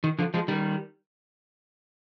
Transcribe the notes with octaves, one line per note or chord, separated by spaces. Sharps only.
D#3
D3 F3
F3 G#3
D#3 G3